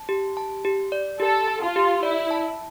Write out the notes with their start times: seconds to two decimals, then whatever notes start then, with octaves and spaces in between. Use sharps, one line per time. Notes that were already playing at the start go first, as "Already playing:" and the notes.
Already playing: A5
0.09 G4
0.37 A5
0.65 G4
0.92 D5
1.20 G4 A4
1.48 A5
1.62 F4
1.76 G4
2.03 E4 D5
2.31 A5